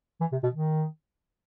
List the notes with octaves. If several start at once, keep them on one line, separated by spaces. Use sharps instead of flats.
E3
C3
B2
D#3